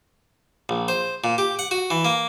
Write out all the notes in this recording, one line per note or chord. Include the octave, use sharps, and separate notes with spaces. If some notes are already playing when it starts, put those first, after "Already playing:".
A#1
C5
A#2
G4
F#5
F#4
E3
A#3